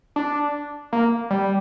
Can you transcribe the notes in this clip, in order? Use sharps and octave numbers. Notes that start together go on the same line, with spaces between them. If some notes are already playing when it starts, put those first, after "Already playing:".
D4
A#3
G3